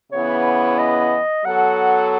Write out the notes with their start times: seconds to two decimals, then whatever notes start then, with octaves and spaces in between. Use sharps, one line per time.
0.12 C#3 E3 B3 E4 C#5
0.79 D#5
1.45 F#3 B3 F#4 A4 F#5